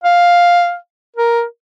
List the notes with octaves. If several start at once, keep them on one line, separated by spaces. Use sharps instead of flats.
F5
A#4